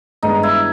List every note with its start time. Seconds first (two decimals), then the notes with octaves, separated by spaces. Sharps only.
0.23 G2 D#3 G#3 B3 D4 D#4
0.43 E4